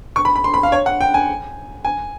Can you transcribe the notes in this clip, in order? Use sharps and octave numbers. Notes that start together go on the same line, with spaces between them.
C#6
B5
B5
C6
B5
F5
C#5
F#5
G5
G#5
G#5